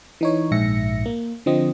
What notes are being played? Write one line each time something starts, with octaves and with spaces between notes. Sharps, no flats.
E3 D#4 C#5
A#1 G#2 E5 A#6 C#7
A#3
D3 F3 C4 D#5